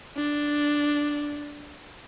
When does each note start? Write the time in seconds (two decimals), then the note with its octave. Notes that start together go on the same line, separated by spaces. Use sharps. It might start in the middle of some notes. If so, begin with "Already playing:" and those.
0.17 D4